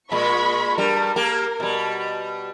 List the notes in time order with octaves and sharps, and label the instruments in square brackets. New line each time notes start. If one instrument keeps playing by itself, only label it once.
[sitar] A#2 G#3 [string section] B5 C#6
[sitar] G2 G3 [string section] A#4
[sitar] A#3 G4
B2 G3